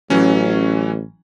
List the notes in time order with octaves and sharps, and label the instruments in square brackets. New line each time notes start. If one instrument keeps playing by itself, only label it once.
[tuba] A1 [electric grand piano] E3 F#3 C#4